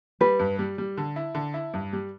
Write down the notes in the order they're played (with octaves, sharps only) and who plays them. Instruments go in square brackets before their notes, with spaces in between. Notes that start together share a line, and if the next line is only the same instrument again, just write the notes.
[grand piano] G3 [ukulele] B4
[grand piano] G2
G3
G3
D3
E4
D3
E4
G2
G3